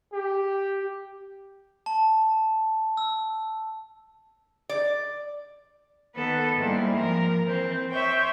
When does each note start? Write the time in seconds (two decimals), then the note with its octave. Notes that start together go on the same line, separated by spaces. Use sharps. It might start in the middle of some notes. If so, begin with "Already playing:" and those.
0.13 G4
1.86 A5
2.97 E6
4.69 D5
6.15 D#3 B3 A4 B4
6.54 G#2 G3 G#3 A#3 C4 E4
6.97 F3 A#4
7.43 E3 C4
7.91 C5 C#5 E5 G5